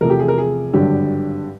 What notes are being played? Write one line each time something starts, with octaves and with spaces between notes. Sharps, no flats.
E2 C3 F3 A3 A#4
G4
G#4
A#4
G#4
G#1 G2 D3 F#3 G4